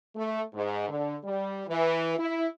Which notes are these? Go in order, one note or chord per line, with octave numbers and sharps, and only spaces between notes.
A3
G#2
D3
G3
E3
E4